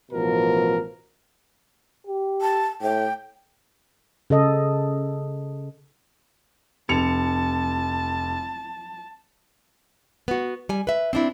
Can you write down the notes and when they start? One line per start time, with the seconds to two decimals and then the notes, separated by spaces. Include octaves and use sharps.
0.12 A1 B2 F3 A#4
2.07 G4
2.42 A5
2.82 A2 G5
4.30 C#3 A4 D#5
6.89 F1 A5 C#7 F7
10.28 B3 F#4
10.69 G3 G#5
10.87 B4 E5
11.13 C4 D4 E4